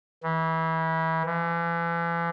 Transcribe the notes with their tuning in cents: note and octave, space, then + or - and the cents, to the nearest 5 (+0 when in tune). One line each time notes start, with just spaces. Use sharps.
E3 -25
E3 +40